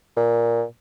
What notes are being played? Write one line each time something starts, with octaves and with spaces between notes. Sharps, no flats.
A#2